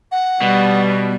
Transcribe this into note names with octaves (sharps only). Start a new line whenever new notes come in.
F#5
B2 G3